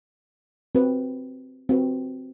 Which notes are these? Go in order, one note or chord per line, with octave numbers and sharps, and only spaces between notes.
C4 F#4 B4
C4 F#4 B4